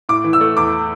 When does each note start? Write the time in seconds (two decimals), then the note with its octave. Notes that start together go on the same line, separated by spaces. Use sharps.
0.09 A2 D6
0.24 E3
0.33 E6
0.41 A3
0.57 E2 D6